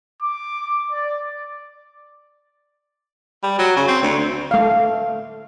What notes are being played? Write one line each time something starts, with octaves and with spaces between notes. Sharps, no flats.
D6
D5
G3
F#3
C#3
C4
D2
A3 F5